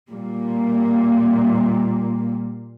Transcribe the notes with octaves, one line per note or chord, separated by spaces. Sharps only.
A#2 G3 A#3